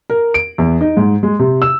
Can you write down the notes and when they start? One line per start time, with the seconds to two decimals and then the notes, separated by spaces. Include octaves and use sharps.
0.10 A#4
0.34 D7
0.58 E2
0.81 D#4
0.97 G#2
1.23 G#3
1.39 C3
1.62 E6